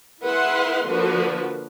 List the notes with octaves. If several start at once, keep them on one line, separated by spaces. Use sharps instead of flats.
E4 G#4 B4 E5 F#5 C6
D3 F3 A#3 F#4 B4